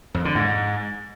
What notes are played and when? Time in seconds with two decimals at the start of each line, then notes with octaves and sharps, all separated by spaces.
0.14 F2
0.25 D3
0.35 G#2